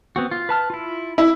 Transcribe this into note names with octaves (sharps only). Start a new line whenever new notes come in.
B3 C4 F#4
F4
B4 A5 F6
E4 F4
E4